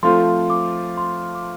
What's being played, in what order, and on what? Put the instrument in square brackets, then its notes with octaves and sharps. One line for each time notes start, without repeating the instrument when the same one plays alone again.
[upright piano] F3 A3 C4 F4 [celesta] C6
[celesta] D6
C6
D6